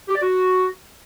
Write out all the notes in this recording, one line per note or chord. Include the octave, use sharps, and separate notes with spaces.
G4
D5
F#4